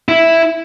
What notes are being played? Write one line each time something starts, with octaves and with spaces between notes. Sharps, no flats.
E4